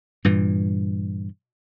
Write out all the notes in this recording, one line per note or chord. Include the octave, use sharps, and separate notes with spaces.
G2 A#2 E3